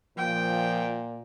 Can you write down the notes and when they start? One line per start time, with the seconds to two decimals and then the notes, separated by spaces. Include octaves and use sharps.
0.18 A#2 F3 G5